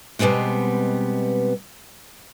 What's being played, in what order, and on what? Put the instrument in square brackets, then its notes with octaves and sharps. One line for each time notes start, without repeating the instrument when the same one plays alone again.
[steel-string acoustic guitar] B2 G3 G#3 B3 C4